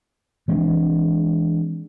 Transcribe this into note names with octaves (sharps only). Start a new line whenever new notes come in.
E3 G#3 C4 D4